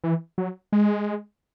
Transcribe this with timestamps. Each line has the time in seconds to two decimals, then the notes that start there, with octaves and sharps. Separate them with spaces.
0.04 E3
0.38 F#3
0.73 G#3